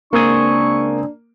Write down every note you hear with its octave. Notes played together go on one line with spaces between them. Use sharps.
C#2 A#3 C4 D4 G#4 C#6